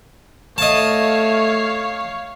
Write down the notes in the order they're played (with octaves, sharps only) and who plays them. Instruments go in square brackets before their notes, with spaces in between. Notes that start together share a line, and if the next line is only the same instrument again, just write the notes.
[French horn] A3 [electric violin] C#5 F5 [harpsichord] D#5 A5